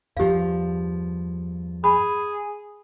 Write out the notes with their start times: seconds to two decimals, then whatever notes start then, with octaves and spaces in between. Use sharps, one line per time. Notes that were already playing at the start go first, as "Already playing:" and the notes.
0.17 E2 G2 F3 G4 F5
1.84 G#4 B5